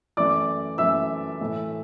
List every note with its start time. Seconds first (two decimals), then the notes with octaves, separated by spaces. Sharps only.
0.17 F#2 E3 A3 D5 D6
0.78 F#2 E3 A3 E5 E6
1.41 A2 E3 A3